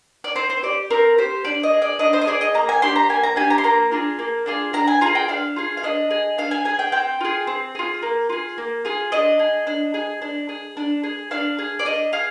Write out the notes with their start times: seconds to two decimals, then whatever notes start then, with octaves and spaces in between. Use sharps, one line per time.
0.24 D5
0.36 C4 C5
0.50 C5
0.63 G4 D5
0.90 C4 A#4
1.18 G4 C5
1.44 D4 D5
1.63 D#5
1.73 G#4
1.82 D5
1.99 D4 D#5
2.13 C5
2.21 D#5
2.27 G#4 D5
2.41 D#5
2.54 A#3 A#5
2.69 G#5
2.82 D4 G4 C6
2.96 A#5
3.09 A#3 G#5
3.23 A#5
3.36 D4 G4 G#5
3.50 A#5
3.58 C6
3.64 A#3 A#5
3.92 D4 F4 G#4
4.19 A#3
4.46 D4 F4 G#4
4.73 D4 A#5
4.87 G#5
5.01 F4 G#4 A#5
5.15 G5
5.28 D4 F5
5.56 F4 G#4
5.77 F5
5.83 D4 D#5
6.11 G#4
6.38 D4 F5
6.51 G#5
6.65 G#4 G#5
6.79 G5
6.92 C4 G5
7.21 F4 G#4
7.47 C4
7.75 F4 G#4
8.02 A#3
8.29 F4 G#4
8.58 A#3
8.85 F4 G#4
9.12 D4 D#5
9.39 G#4
9.67 D4
9.94 G#4
10.22 D4
10.49 G#4
10.77 D4
11.03 G#4
11.31 D4 F5
11.58 G#4
11.79 D5
11.85 D4 D#5
12.13 G#4 F5